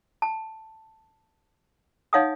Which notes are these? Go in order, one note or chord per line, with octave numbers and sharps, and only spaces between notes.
A5
D#4 C#5 F5 F#5 G#5 D#6